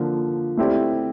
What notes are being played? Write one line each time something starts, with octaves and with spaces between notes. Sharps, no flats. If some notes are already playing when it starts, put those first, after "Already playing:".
Already playing: D3 F3 A#3
A3 C4 E4 G4 D5